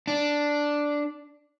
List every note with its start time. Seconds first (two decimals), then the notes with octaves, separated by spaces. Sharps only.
0.07 D4